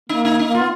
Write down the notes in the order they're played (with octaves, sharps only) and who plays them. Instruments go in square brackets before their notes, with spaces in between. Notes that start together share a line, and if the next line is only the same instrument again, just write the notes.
[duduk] A#3 [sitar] D#4
[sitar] D#4
D#4
[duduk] A#3
[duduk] B3 [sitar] F4